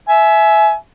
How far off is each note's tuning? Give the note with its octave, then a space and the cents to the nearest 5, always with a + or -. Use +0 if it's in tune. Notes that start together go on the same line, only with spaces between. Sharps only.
E5 +0 G#5 +30